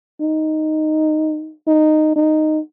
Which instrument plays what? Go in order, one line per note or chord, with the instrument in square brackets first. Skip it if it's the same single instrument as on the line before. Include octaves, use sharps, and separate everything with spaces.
[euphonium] D#4
D#4
D#4